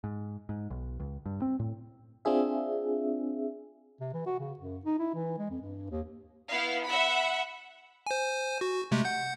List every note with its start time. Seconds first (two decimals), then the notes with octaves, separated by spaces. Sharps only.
0.04 G#2
0.49 G#2
0.70 B1
1.00 C#2
1.26 G2
1.42 C4
1.60 A2
2.25 C4 D4 F4 G#4 E5
4.00 C3
4.13 E3
4.26 F#4
4.39 C#3
4.59 F#2
4.85 D#4
4.99 E4
5.14 E3
5.38 G#3
5.50 F2
5.61 G2
5.90 D#2
6.48 B3 E4 F5
6.84 E5 F#5 B5
8.06 C5 G#5
8.61 F#4
8.91 C3 G#3 A3
9.05 F#5 G6